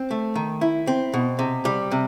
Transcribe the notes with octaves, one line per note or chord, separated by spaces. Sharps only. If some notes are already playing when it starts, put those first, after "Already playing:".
Already playing: C4
A3
D#3
E4
C4
B2
C3
G3
C3